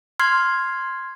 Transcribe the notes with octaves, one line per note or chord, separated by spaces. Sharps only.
C6 F6 G#6 C7